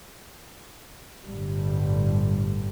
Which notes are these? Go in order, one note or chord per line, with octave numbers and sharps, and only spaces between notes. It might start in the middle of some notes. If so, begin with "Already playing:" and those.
G1 A2 D3 G3